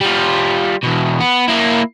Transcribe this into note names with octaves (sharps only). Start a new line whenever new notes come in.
G3 F4
E2 B2
B3
A#3 E4